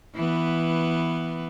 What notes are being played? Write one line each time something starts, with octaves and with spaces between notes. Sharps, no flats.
E3 B3